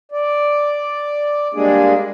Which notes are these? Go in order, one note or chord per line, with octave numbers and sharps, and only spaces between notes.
D5
G3 G#3 A#3 D4 G#4